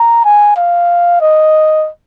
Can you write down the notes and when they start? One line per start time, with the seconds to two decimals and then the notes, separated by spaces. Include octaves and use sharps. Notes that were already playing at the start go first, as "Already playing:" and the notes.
Already playing: A#5
0.25 G#5
0.57 F5
1.21 D#5